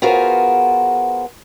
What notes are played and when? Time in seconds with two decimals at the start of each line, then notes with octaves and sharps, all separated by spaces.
0.02 B3 F4 F#4 G#4 A#4 C5